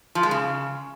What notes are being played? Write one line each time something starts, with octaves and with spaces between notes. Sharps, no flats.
F3
G#3
C#3